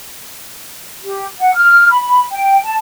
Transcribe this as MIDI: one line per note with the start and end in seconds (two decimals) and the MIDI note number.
1.03 1.25 67
1.38 1.54 78
1.54 1.87 89
1.91 2.25 83
2.31 2.61 79
2.63 2.76 81